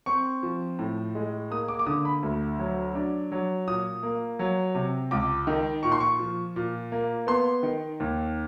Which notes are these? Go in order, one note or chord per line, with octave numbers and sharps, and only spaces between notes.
C4 C#6
F3
A2
G#3
A#3 D#6
D6
D6
D3 D#6
B5
D2
F#3
D4
F#3
A#2 D#6
A#3
F#3
C3
C#2 D6
D#3
A#2 C#6
C6
C#6
F3
A#2
A#3
B3 C6
D#3
D#2